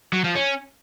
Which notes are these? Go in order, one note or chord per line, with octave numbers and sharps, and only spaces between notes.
F#3
F3
C#4